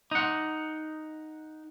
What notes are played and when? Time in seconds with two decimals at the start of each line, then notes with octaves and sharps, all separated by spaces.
0.11 D#4 F#5